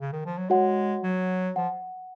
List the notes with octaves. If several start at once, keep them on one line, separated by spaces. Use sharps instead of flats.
C#3
D#3
F3
F#3
G#3 F#4 C#5 F#5
F#3
F3 F#5